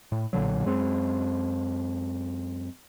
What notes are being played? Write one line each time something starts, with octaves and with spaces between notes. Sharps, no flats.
A2
B1 A#2 D3 F#3
F#2 G#3 C4